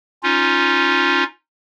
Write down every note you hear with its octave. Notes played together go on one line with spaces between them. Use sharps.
C#4 D#4 F4